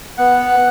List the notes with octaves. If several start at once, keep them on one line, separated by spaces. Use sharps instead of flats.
B3 F#5